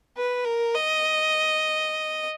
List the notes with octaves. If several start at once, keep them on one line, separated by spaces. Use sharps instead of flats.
B4
A#4
D#5